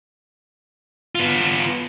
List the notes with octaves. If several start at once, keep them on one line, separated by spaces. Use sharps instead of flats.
B3 F4